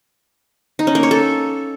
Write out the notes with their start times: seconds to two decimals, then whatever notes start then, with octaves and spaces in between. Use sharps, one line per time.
0.79 D#4
0.87 C#4
0.95 A#3
1.03 C#5
1.11 A4